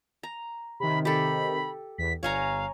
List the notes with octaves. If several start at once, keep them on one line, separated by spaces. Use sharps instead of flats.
A#5
C3 D#3 B5
G4 A4 B5
E2 B6
G1 C#5 F5 G#5 A#5